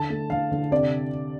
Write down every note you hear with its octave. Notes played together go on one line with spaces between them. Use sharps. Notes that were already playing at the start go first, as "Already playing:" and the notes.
Already playing: D3 A5
A3
D3 F5
D3
C3 D5